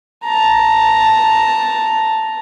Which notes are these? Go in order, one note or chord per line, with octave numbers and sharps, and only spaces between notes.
A5 A#5